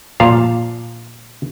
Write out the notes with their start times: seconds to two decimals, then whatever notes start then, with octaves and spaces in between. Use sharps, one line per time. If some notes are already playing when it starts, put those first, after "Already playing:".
0.20 A#2 F3 F5 A5